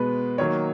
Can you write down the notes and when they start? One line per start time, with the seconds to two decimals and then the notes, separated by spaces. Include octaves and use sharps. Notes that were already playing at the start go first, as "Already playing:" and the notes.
Already playing: B2 G#3 B3 B4
0.38 D#3 F#3 A#3 C#5